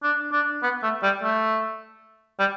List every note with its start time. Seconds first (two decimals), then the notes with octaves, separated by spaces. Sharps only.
0.03 D4
0.32 D4
0.63 B3
0.83 A3
1.03 G3
1.23 A3
2.40 G3